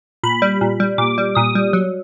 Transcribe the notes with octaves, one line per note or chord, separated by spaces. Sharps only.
A#2 B5
G3
A#2
G3
A#2 D6
G3
A#2 D#6
G3
F#3